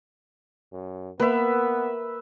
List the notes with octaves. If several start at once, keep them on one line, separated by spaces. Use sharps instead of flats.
F#2
A#3 B3 B4 E5